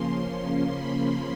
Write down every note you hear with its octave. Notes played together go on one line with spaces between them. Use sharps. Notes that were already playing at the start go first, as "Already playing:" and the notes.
Already playing: C#3 F3 A#3 C#4 C6
B5